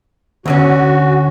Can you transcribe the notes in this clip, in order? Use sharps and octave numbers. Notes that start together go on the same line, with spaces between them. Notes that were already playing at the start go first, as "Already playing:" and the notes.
D2 D3 C#4 F#4